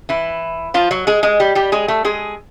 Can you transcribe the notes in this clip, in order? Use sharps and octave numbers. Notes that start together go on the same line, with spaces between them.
E3 E4
F3 F4
F#3 F#4
G#3 G#4
G#3 G#4
G3 G4
G3 G4
G#3 G#4
A3 A4
G#3 G#4